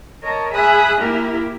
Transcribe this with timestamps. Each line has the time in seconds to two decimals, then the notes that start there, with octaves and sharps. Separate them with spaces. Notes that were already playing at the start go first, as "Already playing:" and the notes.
0.22 A#4 C#5 D#5 A5
0.53 G#4 E5 G#5 B5 D#6 F#6
0.99 A#3 E4 G4 A#4